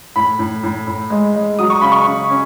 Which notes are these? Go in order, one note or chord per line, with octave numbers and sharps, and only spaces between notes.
A2 B5
A2
A2
A2
G#3
G#3
F#3 D#6
C#6
C#3 B5
C#6
C#3
C#4